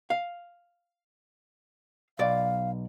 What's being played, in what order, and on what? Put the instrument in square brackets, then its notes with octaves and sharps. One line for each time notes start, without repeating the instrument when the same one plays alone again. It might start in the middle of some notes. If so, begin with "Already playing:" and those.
[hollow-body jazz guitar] F5
[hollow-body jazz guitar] B1 D5 [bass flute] F5